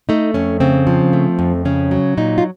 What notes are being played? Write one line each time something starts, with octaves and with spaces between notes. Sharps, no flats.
A3 D#4
F2 C#4
C#3 C4
F3
A3
F2
C#3 C#4
F#3
A#2 D#4
F4